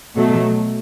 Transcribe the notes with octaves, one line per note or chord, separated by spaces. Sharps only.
B2 F#3 A3